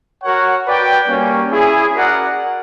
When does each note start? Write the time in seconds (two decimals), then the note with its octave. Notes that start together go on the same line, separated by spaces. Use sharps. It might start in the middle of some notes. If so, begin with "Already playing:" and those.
0.23 F#4 A#4 C#5 F#5
0.65 F#4 B4 D5 G5
1.08 G3 A#3 C#4
1.52 C#4 E4 G#4
1.94 F#4 A#4 D5 F#5